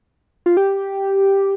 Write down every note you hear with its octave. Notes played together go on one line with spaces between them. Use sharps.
F4
G4